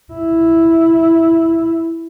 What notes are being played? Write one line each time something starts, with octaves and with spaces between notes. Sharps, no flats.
E4